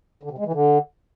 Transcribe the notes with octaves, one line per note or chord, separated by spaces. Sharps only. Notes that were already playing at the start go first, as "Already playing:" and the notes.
D3
C3
G#3
E3
D3